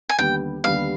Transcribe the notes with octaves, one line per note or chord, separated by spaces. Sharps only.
G#5
D#2 D3 G3 B3 G5
D#2 D3 G3 B3 F5